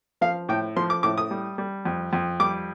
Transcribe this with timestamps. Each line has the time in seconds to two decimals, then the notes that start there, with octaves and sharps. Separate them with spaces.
0.21 F3 F5
0.49 A2 G5
0.76 F3 C6
0.90 D6
1.03 A2 D6
1.18 D#6
1.31 G3
1.58 G3
1.85 F2
2.13 F2
2.40 G3 D6